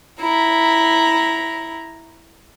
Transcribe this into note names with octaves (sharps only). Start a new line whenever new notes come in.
E4 A#5